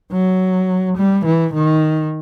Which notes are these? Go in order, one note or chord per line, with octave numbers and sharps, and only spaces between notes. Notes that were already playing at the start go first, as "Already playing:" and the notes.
F#3
G3
E3
D#3